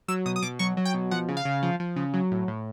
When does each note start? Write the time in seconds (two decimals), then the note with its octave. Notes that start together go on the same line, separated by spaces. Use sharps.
0.08 F#3 E6
0.26 B2 D#6
0.36 D#6
0.42 B2 D6
0.59 F#3 C#6
0.77 F#3
0.85 G5
0.94 B2
1.11 F3 F#5
1.28 C#3
1.37 F5
1.45 C#3
1.63 F3
1.80 F3
1.96 C#3
2.14 F#3
2.31 A2
2.48 A2